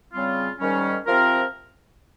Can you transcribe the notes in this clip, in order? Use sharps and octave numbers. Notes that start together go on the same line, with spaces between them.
C#3 G3 C4 F4
G#2 D#3 G3 C#4
C3 F3 C4 F4 A#4